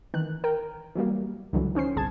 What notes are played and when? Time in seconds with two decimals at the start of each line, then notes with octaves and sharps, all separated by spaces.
0.14 D#3 E3 F#6
0.44 A#4 G5
0.95 E3 F#3 G3 A#3
1.53 C#2 D3 E3 F#3
1.75 D#3 C#4 C5 C7
1.96 G1 C2 G#4 A5 G#6